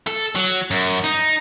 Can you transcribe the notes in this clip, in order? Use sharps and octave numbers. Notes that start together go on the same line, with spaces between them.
A4
F#3
F#2
D#4